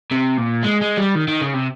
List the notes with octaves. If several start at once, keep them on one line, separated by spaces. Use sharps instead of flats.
C3
A#2
G#3
G#3
G3
D#3
D#3
C#3
C3